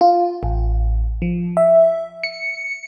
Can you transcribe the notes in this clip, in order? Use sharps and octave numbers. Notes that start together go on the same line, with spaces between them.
F4
A1
F3
E5
C#7